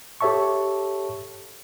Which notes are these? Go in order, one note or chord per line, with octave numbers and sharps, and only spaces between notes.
G4 A4 C#5 E5 A5 C#6